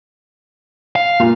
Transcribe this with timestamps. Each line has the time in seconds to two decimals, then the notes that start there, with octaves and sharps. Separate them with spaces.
0.96 F5
1.20 A#2 F4